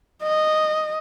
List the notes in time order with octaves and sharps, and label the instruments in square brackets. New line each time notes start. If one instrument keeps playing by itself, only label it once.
[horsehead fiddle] D#5